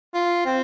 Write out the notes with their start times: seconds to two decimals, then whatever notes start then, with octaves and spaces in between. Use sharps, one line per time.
0.14 F4
0.46 C4